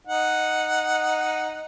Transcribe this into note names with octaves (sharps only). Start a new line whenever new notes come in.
D#4 F#5